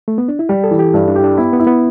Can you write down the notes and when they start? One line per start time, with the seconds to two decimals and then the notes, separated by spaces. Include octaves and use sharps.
0.08 A3
0.18 B3
0.28 D4
0.39 E4
0.49 G3 G4
0.64 A4
0.71 E3
0.79 G4
0.94 G2 E4
1.08 D4
1.16 G4
1.24 D4
1.37 B3 E4
1.53 B3
1.60 E4
1.67 B3